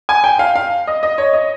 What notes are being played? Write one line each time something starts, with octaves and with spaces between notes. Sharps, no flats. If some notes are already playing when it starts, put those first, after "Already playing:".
G#5
G5
F5
F5
D#5
D#5
C#5
D#5